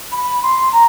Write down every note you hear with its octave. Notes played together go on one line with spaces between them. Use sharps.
B5
C6
A#5